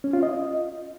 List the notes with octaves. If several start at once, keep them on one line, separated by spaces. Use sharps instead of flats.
C#4
F4
D#5